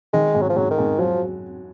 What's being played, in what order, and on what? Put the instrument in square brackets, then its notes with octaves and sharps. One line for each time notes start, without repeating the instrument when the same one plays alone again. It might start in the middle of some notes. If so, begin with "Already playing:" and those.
[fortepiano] D#3 [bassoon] G#3
[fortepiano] G#2
[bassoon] F#3
F3
[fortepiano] G#2 [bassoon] F#3
[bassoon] D#3
[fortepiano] G#2
[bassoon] F3 [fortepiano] F#3